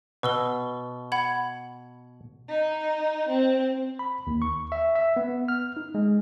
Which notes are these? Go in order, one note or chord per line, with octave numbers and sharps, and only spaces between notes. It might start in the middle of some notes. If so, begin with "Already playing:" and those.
B2 B4 E6 G7
F#5 B5 G#6
D#4
C4
B5
D#2
C#6
E5
E5
B3
F6
D#4
G#3